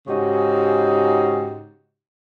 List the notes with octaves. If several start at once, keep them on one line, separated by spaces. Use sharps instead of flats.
G#2 C#3 D#4 F#4 G4